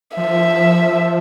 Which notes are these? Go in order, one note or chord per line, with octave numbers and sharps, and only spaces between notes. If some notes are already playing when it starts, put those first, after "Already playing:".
F3 E5